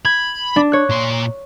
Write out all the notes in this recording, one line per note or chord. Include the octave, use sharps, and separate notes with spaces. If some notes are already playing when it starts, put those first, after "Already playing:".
B5 G#6
D4
C#5 F#6
A#2 C6